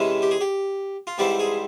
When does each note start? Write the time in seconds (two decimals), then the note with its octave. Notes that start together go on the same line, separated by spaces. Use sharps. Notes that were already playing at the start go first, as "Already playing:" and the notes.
Already playing: C3 E3 G#3 C#4 E4
0.22 G4
0.31 G#4
0.41 G4
1.07 F4
1.18 G#2 E3 G3 C4 E4 G4
1.39 G#4